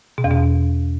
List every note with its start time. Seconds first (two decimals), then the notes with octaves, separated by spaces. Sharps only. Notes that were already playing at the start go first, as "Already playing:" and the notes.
0.18 B2
0.24 E2
0.31 B2